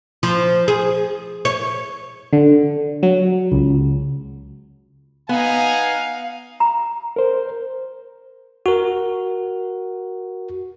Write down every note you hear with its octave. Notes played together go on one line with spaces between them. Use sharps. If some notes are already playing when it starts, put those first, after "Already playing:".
F3
G#4
C#5
D3
F#3
C#2
B3 D#4 F5 F#5 G#5
A#5
A#4 C5
F#4 A#4